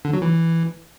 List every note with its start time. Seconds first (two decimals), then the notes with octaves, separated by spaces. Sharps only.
0.05 D3
0.13 F#3
0.22 E3